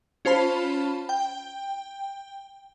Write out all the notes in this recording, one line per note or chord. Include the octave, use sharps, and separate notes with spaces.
C#4 F4 C5 A5 B5
G5